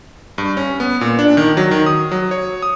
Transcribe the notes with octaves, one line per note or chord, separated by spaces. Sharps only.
G2
C#4
B3
A#2
D4
D#3
F#3
D#3
D#6
F#3
C#5
D#6